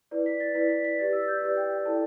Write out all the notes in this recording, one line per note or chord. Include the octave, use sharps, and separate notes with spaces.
E4 B4 D5
B6
A6
E4 B4 D5 B6
B6
B6
G4 B4 D5 A6
E6
A6
G6
G4 B4 D5 E6
G5
G5
E4 A4 D5 A5